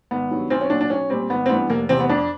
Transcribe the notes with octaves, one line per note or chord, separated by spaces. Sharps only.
G#1 B3
G2 D#3 F#3
B1 C4
C#4
A#2 F#3 D4
D4
B1 C#4
A#2 G3 C4
G#1 B3
C4
G2 E3 G3 B3
F1 A#3
E2 C3 C4
B3
F2 D4